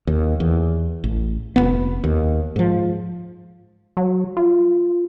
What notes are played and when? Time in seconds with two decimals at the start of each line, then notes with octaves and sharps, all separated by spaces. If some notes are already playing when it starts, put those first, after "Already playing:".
0.07 D#2
0.40 E2
1.04 A1
1.56 F1 E2 B3
2.04 D#2
2.56 G#2 F3
3.97 F#3
4.37 F4